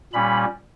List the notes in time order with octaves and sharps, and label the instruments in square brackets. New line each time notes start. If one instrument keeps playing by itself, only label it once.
[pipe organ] A#2 G3 C#4 B5